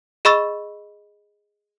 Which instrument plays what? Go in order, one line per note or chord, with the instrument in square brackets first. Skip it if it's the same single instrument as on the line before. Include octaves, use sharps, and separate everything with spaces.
[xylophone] G#4 D#5 B5 C#6 E6 A6